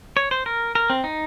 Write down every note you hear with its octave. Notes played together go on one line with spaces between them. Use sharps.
C#5
C5
A#4
A#4
C4
D#4